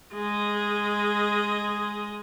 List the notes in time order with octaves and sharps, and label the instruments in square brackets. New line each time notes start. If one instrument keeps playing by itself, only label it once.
[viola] G#3 D#5